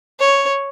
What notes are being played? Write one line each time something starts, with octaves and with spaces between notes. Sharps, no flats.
C#5